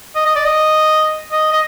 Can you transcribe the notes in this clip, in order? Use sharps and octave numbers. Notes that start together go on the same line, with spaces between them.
D#5
D#5
D5
D#5
D#5
D#5